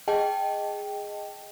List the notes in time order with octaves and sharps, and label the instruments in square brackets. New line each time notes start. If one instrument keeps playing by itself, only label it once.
[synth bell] G#4 D#5 G5 A5